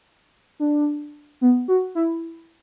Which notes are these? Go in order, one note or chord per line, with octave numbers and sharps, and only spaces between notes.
D4
B3
F#4
E4